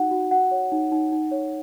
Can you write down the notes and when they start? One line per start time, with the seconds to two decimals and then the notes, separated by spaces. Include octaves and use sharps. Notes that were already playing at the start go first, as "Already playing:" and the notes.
Already playing: D#4 F#4 F#5
0.11 F#4
0.31 F#4 F#5
0.51 C#5
0.72 D#4
0.92 D#4
1.12 D#4
1.31 C#5